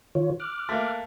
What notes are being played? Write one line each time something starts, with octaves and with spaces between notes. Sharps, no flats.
D#3 F4 C#5
D6 F6 F#6
A3 A#3